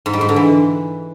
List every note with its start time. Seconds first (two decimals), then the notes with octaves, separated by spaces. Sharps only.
0.06 G#2
0.13 G3
0.21 G#2
0.29 D3
0.36 E3